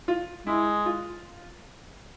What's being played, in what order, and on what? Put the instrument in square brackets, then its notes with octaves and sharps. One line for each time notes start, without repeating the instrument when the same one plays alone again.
[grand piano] F4
[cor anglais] G#3 [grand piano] E4
[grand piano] F4